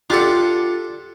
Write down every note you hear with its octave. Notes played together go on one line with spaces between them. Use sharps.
D4 F4 G4 A4 F#5